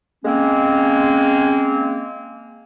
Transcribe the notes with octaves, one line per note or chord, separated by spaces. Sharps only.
G#3 A#3 C4 C#4